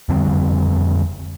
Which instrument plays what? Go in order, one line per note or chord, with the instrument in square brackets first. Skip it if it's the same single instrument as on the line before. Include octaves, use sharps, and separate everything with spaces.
[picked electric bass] F2 D3 G3 C4